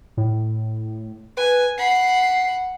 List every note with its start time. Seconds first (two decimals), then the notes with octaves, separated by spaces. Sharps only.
0.17 A2
1.37 B4 G#5
1.78 F#5 B5 C7